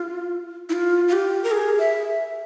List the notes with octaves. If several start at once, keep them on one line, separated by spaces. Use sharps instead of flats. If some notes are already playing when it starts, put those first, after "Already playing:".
Already playing: F4
E4
F4
F4
G4
A#4
G#4
E5